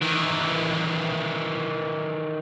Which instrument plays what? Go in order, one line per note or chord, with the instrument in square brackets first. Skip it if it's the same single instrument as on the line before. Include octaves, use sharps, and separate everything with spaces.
[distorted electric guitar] D#3 E3